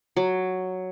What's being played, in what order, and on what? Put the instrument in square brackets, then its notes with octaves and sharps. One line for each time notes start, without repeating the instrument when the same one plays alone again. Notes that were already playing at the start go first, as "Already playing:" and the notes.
[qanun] F#3